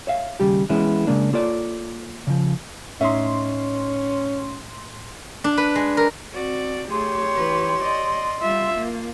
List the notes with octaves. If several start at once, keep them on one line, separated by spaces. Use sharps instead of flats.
C#5 E5 F5
D#2 C#3 G3 G4
E3 G#3 B3 C#4 E4
C#3 G#3 A#3 D4
A#3 F4 A4 C#5 D5
C#3 F3
A2 C#4 D#4 F4 E5 C6
D4
B4
G#3
A#4
C4 F#4 D5
A3 G4 G#4 C#5 C6
E3 B4
D5 D#5
G3 F4 E5
A#3